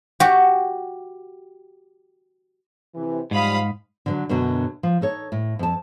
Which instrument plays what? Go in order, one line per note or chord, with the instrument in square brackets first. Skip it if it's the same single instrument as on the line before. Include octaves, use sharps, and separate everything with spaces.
[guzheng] F#4 G4
[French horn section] C3 E3
[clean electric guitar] G#2 [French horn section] F3 G3 [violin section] F5 B5 D#6
[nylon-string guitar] D3 E3 F#3
F#2 B2 D3 F#3
F3
D#4 A4 C#5
A2
F2 A5